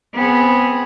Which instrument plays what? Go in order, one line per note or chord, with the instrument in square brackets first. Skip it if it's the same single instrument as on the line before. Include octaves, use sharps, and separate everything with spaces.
[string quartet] B3 C4 G#4